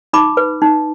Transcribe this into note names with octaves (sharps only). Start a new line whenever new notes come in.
D#4 B5 D6
B4
D#4